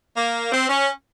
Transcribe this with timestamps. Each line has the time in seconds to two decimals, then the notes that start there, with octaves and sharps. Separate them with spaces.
0.17 A#3
0.52 C4
0.69 C#4